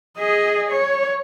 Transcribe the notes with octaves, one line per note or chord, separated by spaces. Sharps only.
G#4 D#5
C#5